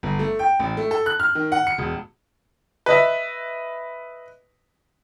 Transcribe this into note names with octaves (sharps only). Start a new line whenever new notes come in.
G1
A3
G5
A1
A3
A4
F#6
F6
D#3
F#5
C#7
E1
B4 D#5 E5